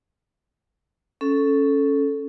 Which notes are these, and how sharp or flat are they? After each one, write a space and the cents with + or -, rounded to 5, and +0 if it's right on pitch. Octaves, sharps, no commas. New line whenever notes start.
C#4 +0 A4 -5